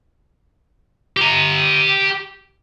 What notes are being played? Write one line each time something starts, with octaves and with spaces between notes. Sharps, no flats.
G4 A#5